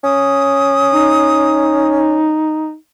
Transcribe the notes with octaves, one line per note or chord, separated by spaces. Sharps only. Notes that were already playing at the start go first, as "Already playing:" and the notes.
C#4 D#6
D#4